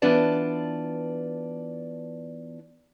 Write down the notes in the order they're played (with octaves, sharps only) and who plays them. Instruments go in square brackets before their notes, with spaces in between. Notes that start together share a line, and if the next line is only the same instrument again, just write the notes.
[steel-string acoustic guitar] E3 B3 D4 F4 D5 A5